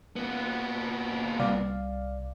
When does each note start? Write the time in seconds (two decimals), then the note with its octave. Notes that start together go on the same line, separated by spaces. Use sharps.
0.16 A#2 B3
1.40 C2 D5 F5